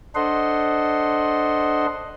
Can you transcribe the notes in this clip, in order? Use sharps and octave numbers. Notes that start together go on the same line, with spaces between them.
D4 A4 C5 D#5 F#5 C6